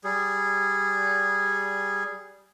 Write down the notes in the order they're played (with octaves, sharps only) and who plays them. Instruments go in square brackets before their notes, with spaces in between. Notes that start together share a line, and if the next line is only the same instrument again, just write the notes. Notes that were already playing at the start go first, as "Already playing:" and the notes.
[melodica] G3 G#4